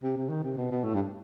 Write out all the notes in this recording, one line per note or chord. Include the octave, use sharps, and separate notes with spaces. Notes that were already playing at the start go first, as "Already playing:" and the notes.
C3
C3
D#3
C3
B2
B2
A2
G2